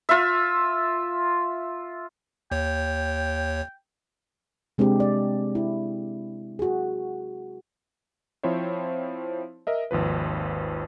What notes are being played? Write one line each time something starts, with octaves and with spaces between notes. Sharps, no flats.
F4 E5
D#2 C#5 G5
C3 G#3 C4 D4 G4
D5
E4
F#4 G#4
F3 C4 E4 C5 C#5
A#4 D#5 E5
G#1 D#2 F3 B4